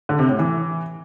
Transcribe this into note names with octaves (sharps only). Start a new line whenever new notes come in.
D3
C3
A2
E3